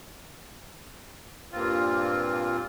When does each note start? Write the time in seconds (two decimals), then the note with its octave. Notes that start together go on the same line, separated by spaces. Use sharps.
1.52 G2 A#2 C4 F4